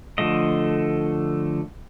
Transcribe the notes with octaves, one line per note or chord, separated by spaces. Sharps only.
D3 F3 A3 D#5